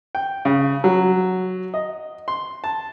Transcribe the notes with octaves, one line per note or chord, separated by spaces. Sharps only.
G5
C#3
F#3
D#5
C6
A5